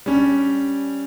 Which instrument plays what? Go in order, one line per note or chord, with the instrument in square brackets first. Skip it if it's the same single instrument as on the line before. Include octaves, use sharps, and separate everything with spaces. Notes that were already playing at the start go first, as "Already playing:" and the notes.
[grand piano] G3 C#4 D4